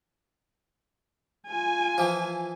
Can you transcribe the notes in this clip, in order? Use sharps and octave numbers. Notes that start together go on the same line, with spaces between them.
F4 G#5
E3 F3